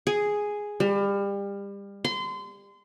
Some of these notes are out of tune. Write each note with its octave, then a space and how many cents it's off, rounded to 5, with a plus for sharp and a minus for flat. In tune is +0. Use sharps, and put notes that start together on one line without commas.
G#4 +0
G3 +30
C6 -30